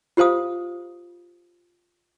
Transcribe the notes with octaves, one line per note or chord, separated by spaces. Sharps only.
F4 G4 C5 F5 D#6